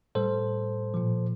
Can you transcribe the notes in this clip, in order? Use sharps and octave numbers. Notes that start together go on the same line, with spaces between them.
A2 G3 A4 C5
A#2 F3